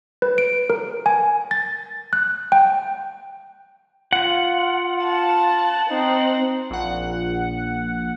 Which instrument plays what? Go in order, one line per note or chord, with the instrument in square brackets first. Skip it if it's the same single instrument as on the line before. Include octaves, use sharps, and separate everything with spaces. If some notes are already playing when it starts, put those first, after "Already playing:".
[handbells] B4
D7
A#4
G#5
A6
F#6
G5
[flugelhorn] F4 [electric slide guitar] F#5
[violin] A5
[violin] C4 [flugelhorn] D#4
[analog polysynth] A#1 F#5